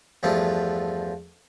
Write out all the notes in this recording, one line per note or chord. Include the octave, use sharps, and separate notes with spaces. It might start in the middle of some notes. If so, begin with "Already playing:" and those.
E2 G2 F3 A3